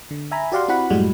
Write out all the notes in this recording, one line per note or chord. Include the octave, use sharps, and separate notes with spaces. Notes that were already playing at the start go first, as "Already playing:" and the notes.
D3
E5 G#5 A#5 B5
F#4 G4 D5 F5 F#5 C6
C4 E4 F#4 F#5 B5
F#2 A2 G3 G#3 F#4